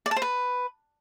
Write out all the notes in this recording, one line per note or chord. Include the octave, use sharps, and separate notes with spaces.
D5
A5
C5
B4